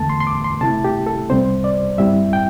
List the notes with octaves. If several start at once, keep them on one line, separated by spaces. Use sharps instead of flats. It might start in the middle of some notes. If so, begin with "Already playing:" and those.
Already playing: E2 D3 A3 A5
C6
C6
D6
C6
C3 A3 E4 A5
G4
A4
C2 C3 G3 C4 C5
D5
G2 G3 C4 E4 E5
G5